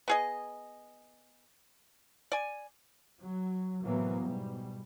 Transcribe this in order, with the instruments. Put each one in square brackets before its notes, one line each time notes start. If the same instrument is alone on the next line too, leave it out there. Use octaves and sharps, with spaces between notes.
[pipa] B3 G#4 D#5
D5 G#5
[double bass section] F#3
A2 C3 E3 F#3 A#3 B3
G#2 B2 G3